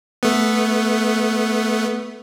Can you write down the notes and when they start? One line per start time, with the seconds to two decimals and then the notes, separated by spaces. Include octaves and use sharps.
0.23 A3 B3